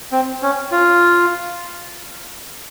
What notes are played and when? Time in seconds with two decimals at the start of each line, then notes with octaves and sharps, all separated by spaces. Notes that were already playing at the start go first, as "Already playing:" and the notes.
0.12 C4
0.42 C#4
0.71 F4